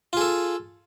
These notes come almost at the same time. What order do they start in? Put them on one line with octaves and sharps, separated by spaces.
F4 G#4 A4